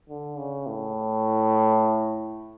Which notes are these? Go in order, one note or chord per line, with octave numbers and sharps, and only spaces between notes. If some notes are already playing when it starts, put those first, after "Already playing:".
D3
C#3
A2